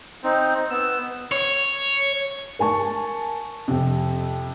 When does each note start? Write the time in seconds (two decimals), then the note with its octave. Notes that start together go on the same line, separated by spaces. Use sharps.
0.24 C4 D#4
0.70 B3 E6
1.32 C#5
2.59 A#4 G#5 A5 C#6
3.68 F2 C3